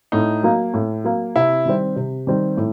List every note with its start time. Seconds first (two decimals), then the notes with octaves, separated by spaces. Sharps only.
0.12 A2 D#4
0.43 F#3 A#3
0.74 A2
1.04 F#3 A#3
1.36 C3 E4
1.66 D#3 G3 C4
1.96 C3
2.27 D#3 G3 C4
2.57 A2